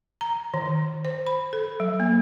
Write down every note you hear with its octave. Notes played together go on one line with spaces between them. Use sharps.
A#5
D#3
C5
B5
A4
F#3
A#3